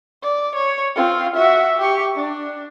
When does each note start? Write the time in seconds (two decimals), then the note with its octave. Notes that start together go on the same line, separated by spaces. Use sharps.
0.22 D5
0.55 C#5
0.96 C4 F4
1.36 F#4 E5
1.78 G4 C#6
2.16 D4